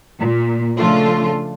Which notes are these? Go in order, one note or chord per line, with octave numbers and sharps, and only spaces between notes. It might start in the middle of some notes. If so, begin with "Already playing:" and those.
A#2
C#3 F3 A3 D4 F4